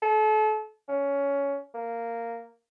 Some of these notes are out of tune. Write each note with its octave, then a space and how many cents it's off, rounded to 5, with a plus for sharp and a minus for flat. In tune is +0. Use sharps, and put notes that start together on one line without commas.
A4 -35
C#4 +15
A#3 -10